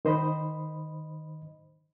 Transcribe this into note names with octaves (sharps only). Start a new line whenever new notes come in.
D#3 C5 D#5 B5